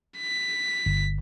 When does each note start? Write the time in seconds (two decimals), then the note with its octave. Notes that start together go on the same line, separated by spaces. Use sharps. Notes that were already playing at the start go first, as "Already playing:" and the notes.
0.18 B6
0.86 G1